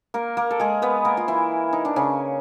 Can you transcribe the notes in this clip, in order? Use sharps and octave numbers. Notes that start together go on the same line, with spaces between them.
A#3 A#4
A#3 A#4
A4
G#3 G#4
B3 B4
A#3 A#4
F4
E3 E4
D#4
D4
C#3 C#4